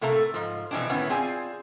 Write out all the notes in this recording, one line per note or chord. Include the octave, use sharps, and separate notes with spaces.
A2 C3 A3 A#3 A4 A#5
G#2 F3
B2 E3 F3 G#3 C4 D4
A2 D#3 E3 B3 C#4 E4
C4 F4 G#4 D5 G#5